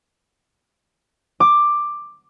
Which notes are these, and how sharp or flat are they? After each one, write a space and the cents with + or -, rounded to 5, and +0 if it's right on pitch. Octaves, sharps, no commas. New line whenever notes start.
D6 +10